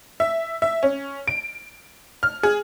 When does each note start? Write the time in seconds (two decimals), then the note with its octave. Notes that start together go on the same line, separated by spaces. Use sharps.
0.20 E5
0.62 E5
0.83 C#4
1.28 D7
2.23 F6
2.43 G#4